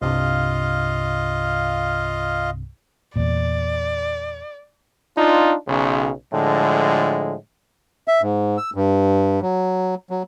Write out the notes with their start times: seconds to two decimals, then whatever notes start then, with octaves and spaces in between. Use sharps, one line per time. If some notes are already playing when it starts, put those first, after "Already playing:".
0.02 C2 G2 C3 F4 D#5 F5
3.16 E2 A#2 D5
5.17 D4 D#4 F4
5.67 B1 C#3
6.32 A2 D3 F3 G#3
8.08 E5
8.22 G#2
8.58 E6
8.75 G2
9.42 F#3
10.11 F#3